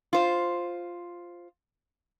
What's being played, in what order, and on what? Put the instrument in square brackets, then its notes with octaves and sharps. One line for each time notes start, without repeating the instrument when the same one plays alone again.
[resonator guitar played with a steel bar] F4 C5